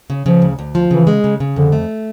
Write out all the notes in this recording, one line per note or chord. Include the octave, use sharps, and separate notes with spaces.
C#3
C#3 F3
D2
D2
F3
C#3 E3
G#3
C#3
C#3
F2 D3
A3